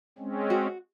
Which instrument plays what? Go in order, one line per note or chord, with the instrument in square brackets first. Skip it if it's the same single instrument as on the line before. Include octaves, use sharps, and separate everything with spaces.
[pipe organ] G#3 C4 C#4
[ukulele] F#4